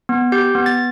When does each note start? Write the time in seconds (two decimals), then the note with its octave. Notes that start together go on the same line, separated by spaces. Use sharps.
0.09 B3
0.32 G4 G6
0.55 B3
0.66 A6